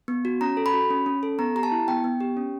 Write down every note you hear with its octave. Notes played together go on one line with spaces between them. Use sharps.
B3
F#4
C#4 A#5
A4
B5
F#4
C#4
C#4
A4
B3 A#5
G4 A#5
A5
E4
B3 G5
B3
G4
C#4